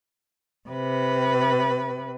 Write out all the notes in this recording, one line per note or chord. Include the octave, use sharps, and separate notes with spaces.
C3 B4